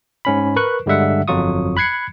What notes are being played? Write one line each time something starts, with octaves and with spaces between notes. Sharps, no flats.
G#2 C#4 B5
A#4 B4 C#6 F#6
G2 D3 G3 G#3 E5 F#5
G1 F2 F#3 F4 C#6 D#6
B5 F#6 G#6 C7 C#7